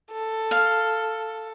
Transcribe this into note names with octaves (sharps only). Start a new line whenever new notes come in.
A4
F5